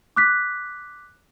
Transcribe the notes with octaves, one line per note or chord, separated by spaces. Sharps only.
D6 F#6 B6